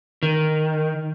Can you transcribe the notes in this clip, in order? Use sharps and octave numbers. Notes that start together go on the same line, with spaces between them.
D#3